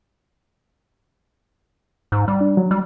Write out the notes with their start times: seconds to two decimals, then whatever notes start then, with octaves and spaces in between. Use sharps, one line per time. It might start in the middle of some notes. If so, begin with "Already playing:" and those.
2.12 G#2
2.28 G3
2.41 D4
2.57 F#3
2.71 G3